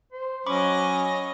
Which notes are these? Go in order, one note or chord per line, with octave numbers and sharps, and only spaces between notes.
C5
F#3 C#4 C#5 D#5 B5 C#6 D6